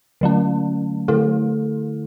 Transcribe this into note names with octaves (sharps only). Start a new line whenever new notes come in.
D3 F#3 A3 C#4
D3 A3 E4 A4